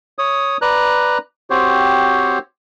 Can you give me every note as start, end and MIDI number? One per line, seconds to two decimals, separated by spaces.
0.19 0.57 73
0.19 0.57 87
0.62 1.18 71
0.62 1.18 74
0.62 1.18 82
0.62 1.18 90
1.50 2.39 60
1.50 2.39 66
1.50 2.39 67
1.50 2.39 72
1.50 2.39 73